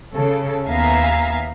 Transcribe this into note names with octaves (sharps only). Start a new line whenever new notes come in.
C#3 A4
D#2 B3 E5 F5 G#5 A#5